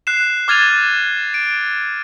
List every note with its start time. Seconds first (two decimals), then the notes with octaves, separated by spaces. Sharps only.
0.07 F#6 C7 E7
0.48 D6 F6 G#6 A6 D#7 F7
1.34 D7